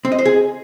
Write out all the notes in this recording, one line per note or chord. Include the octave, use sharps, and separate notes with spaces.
C4
D#5
C5
G#4